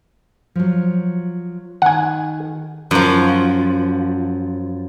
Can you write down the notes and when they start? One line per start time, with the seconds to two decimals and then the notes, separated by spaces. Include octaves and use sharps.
0.55 F3 F#3
1.82 D#3 F#5 G#5
2.91 F#2 F3